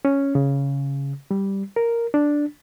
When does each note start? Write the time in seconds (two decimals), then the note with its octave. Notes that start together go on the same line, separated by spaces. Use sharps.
0.05 C#4
0.35 C#3
1.31 G3
1.76 A#4
2.14 D4